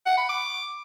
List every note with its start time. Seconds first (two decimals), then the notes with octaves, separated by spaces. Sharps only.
0.06 F#5
0.17 B5
0.29 D6